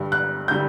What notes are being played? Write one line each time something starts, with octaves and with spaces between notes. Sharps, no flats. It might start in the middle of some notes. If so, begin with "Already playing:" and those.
Already playing: G2 D3 G3
F#6
D3 G3 G6